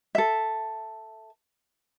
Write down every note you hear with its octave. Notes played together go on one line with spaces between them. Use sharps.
A4 E5